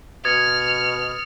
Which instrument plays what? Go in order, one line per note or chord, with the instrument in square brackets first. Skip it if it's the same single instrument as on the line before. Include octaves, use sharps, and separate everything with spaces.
[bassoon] B2 [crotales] D#6 A6 C#7 [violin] F6 [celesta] G#6